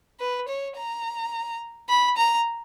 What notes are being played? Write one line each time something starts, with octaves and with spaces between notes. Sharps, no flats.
B4
C#5
A#5
B5
A#5